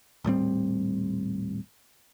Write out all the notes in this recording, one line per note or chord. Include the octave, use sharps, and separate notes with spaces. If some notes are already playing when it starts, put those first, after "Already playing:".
D#1 A2 G3 C4